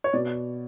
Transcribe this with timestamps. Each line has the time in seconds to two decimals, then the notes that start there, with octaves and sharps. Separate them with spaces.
0.04 C#5
0.13 B2 D5